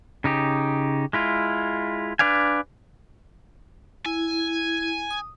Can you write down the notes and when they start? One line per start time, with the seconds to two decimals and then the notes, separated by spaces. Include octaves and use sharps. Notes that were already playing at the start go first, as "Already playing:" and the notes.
0.24 C#3 D#4 G4
1.13 G#3 E4 F4
2.19 D4 B4 D5 F5 G#5
4.06 E4 G#5
5.11 D#6